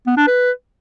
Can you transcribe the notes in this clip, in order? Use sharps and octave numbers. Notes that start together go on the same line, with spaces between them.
B3
D4
B4